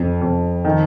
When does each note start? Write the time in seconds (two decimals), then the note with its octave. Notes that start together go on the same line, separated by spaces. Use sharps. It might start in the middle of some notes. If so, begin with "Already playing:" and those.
Already playing: F2
0.22 F2
0.65 D#3